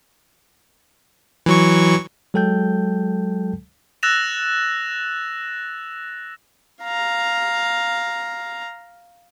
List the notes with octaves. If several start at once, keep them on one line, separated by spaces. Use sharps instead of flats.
E3 F#3 C#6
F#3 G#3 A4 G5 A5 G6
E6 F#6 A6 A#6 E7 F7
F5 A#5